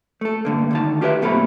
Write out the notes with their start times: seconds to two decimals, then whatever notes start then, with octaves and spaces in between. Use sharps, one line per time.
0.21 A3 A4
0.45 G2 D3 A#3
0.71 D2 D#3 A5
1.01 F4 G4 A#4 B4 D5 E5
1.21 F#2 B2 A3 A#3 C4 B5